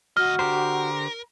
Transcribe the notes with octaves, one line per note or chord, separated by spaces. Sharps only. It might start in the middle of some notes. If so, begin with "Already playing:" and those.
D2 F#4 D#5 F6
D3 G4 A#4 C5